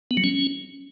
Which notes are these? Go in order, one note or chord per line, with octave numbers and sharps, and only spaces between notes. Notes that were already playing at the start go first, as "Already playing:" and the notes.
B3
F#3
C#4